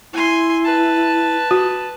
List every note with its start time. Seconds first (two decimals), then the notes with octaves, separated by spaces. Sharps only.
0.13 E4 G#5 C6
0.65 B4 A5
1.51 F#4